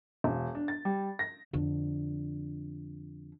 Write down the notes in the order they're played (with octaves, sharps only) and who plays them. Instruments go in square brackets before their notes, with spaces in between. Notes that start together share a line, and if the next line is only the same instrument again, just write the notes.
[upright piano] E1
D4
A6
G3
A#6
[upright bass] F2 D3